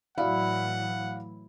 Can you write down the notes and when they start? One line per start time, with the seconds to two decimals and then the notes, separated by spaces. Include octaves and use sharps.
0.18 A2 E3 F#3 E4 F#4 D5 F5 F#5